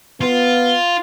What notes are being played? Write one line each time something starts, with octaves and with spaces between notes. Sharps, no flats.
B3 F4